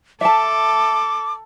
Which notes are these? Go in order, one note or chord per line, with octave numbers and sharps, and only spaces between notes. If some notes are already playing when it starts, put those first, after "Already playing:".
A4 E5 A5 D6